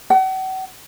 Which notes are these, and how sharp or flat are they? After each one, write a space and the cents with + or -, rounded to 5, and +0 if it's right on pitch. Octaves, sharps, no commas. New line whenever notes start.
F#5 +40